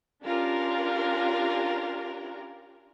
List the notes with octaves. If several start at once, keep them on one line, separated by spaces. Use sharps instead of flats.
C#4 D4 F4 G4 A#4